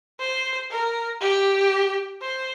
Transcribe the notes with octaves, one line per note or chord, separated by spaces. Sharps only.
C5
A#4
G4
C5